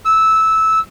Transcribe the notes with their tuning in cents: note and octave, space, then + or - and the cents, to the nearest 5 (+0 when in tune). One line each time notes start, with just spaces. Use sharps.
E6 -15